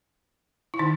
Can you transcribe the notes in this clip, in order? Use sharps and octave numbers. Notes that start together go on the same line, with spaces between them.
E4
D#3 D#4